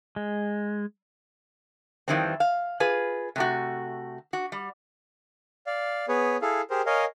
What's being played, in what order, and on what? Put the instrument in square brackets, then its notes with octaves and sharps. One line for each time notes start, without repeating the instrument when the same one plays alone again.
[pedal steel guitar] G#3
[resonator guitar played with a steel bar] F2 G#2 D#3 E3 G3 C4
F5
F4 G#4 B4
C3 A3 F#4
F#4
G3
[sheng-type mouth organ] D5 F5
B3 G#4 B4 C#5
E4 G#4 A4 F5
G4 G#4 A#4 C5
A#4 C#5 D#5 F5 G#5